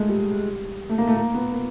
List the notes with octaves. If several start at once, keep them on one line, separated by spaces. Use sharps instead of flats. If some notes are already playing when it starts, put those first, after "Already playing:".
Already playing: G#3 A3
G3
A3
A#3
A3
A#3
B3
A#3